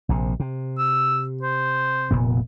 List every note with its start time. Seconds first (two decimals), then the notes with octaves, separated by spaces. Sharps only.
0.09 A#1 C3
0.40 C3
0.79 E6
1.42 C5
2.11 F1 A#2 B3